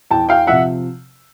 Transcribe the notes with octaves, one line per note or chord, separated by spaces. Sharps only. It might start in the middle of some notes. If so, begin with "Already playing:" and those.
E2 G5 A5
F5 G5
C3 F3 E5 F#5